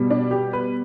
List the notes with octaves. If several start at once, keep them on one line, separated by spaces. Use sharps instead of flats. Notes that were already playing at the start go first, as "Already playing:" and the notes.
Already playing: B2 G3 B3
D4
G4
B4